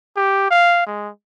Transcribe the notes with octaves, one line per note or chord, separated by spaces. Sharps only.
G4
F5
G#3